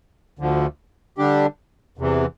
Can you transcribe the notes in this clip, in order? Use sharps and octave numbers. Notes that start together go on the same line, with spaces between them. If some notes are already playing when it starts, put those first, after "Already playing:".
D2 D3 F3
D3 G3 D4 G4
E2 C3 E3